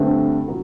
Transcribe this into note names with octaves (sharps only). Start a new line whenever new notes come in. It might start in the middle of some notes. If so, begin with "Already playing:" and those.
Already playing: G2 D3 A3 C4
F#3